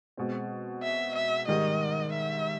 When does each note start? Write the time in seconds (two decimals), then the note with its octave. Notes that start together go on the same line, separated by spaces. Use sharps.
0.17 B2 G#3 C4
0.83 E5
1.15 E5
1.48 G#2 D#3 G3 D#5
2.13 E5